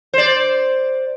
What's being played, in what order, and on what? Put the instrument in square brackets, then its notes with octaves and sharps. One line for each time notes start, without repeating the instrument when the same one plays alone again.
[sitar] C5 D5